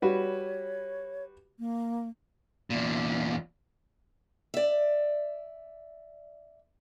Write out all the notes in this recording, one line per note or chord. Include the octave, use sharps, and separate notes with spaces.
G3 F#4 B4 C#5
A#3
E2 A#2
D5 E5